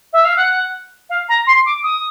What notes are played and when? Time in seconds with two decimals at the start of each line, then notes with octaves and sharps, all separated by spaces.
0.13 E5
0.24 F5
0.36 F#5
1.09 F5
1.28 A#5
1.46 C6
1.65 D6
1.83 D#6